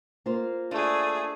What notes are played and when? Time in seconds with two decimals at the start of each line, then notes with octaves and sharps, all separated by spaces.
0.26 A#3 F4 C5
0.71 A3 D4 G#4